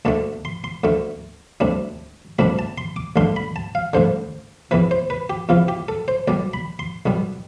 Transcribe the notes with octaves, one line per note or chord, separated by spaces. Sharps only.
D2 D3 A3 A5
C6
C6
D2 D3 A3
D2 C3 G3 D4
D2 C3 G3 D4 B5
A5
C6
D6
A1 G2 D3 C6
B5
A5
F5
A1 G2 D3 C5
E2 C3 E3 B4
C5
B4
G4
E2 C3 E3 F4
G4
A4
C5
B1 B2 G3 D5
B5
C6
B1 B2 G3